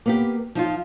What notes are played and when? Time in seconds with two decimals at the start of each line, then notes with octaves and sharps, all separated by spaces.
0.06 A#3 B3 G4
0.55 F3 D#4 F4